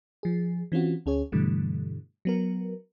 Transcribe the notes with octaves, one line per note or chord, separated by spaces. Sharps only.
F3 G#4
E3 C4 C#4 F4 F#4
D2 C#4 G#4 C#5
G2 B2 D3 E3 G3 A3
F#3 B3 A#4